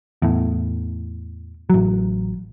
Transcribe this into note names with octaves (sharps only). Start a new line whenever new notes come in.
E2 A2
A1 F#3